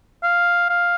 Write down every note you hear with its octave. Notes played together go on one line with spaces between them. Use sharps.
F5
F5